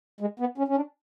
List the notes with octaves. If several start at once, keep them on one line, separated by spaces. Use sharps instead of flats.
G#3
B3
C#4
C#4
D4